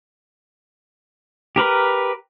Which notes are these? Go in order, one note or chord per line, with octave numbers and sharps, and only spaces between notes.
G4 A#4 B4